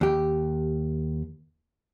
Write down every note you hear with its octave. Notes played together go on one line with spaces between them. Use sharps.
D#2 G4